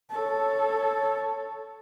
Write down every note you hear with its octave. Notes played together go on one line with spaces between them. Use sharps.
A4 C#5